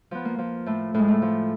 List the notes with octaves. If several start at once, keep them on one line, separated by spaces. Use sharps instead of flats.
F3 B3
A#3
F3
A2 A3
A2 G#3
A3
F3